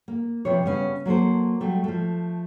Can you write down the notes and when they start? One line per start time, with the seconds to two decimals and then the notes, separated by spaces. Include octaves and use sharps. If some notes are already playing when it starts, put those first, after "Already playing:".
0.08 A#3
0.45 C3 F3 B4 C#5
0.63 C#3 G3 B3 C#4
1.06 F#3 A#3 A4 C5
1.61 F#3 G3 A3
1.84 F3 A3